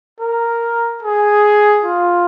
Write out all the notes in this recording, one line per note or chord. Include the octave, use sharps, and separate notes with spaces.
A#4
G#4
F4